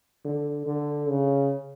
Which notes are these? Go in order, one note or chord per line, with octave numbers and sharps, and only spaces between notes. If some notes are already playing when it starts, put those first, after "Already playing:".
D3
D3
C#3